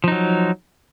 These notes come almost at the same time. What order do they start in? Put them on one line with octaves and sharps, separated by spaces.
F3 D#4 F#3